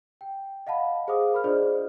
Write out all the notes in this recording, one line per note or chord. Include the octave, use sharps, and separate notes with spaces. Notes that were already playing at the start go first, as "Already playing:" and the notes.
G5
D#5 F5 F#5 A5 B5
G#4 C5 F5 D6 D#6
A#4 B5 F6
D4 F4 G#4 C5 D5 D#5